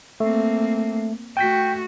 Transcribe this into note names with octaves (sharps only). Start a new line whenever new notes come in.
A3 A#3 C4
A3 F#4 G5 G6 B6